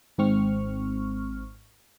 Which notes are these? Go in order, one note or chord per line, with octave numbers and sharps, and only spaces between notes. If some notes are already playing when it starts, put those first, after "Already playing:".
G#1 G#2 C4 C#6 F6